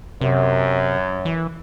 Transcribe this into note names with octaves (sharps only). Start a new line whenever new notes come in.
F#2 C3
E3